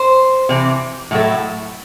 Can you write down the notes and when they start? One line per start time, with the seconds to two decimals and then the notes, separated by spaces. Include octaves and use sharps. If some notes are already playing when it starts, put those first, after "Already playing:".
Already playing: C5
0.49 C3 E3
1.11 A2 F#3 A3